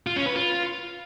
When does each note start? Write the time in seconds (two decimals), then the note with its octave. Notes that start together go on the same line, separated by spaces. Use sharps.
0.07 F4
0.16 C#4
0.26 B4
0.36 F4